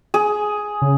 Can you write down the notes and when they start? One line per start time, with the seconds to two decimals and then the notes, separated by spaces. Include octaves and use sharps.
0.14 G#4
0.82 C#3